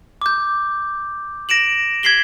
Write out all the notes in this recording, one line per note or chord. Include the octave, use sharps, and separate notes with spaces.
D6 G6
A#6 D7 E7 F#7
G#6 B6 C7 F#7 G7